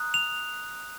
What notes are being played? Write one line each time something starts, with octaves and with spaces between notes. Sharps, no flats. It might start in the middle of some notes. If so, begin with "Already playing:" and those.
Already playing: A#5 D#6 F#6
F7